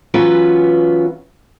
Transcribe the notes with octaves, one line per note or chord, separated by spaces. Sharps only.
E3 F#3 B3 C#4 F4 B4